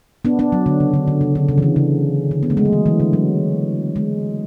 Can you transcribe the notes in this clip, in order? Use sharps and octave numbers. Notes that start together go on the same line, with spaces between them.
B3 D4
B3 D4
F#3
D3
C#3
D3
D3
C#3
D3
C#3
E3
D3
C#3
D3
B3
A3
G#3
F#3
E3
E3
D3
F#3
G#3